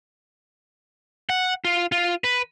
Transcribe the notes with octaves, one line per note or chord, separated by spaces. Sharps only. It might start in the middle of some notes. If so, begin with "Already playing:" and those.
F#5
F4
F4
B4